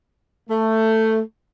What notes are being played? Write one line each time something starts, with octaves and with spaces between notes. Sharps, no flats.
A3